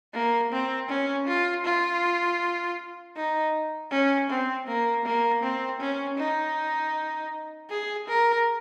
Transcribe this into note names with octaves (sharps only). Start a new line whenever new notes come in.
A#3
C4
C#4
F4
F4
D#4
C#4
C4
A#3
A#3
C4
C#4
D#4
G#4
A#4